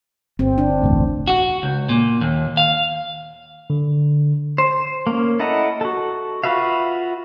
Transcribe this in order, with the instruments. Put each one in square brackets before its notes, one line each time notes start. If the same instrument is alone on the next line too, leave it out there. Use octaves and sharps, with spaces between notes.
[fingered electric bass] G1 [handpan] C4
[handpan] D4
[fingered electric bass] E1 A1 D2
[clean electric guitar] F#4
C#2
A#2
D#2
F5
[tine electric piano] D3
[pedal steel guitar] C5
A#3 C#4
E4 A4 D#5 F#5 A#5
F#4 A4
F4 F#4 B4 E5 F5